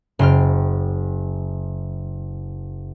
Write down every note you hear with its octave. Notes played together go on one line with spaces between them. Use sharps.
F#1 C5 G5 F6